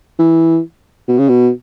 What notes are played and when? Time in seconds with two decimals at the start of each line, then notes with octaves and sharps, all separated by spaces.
0.19 E3
1.08 B2
1.19 C#3
1.29 B2